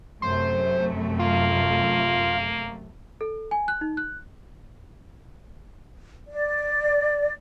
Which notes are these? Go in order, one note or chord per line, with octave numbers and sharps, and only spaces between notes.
F#2 C3 A3 C5
A#3 F4
A4
G#5
F#6
D#4
F#6
D5